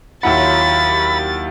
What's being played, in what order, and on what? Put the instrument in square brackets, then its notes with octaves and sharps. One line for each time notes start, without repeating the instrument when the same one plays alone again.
[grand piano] D#2 E4 F#5 [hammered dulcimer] F#3 F4 G4 [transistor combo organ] B5 [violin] A6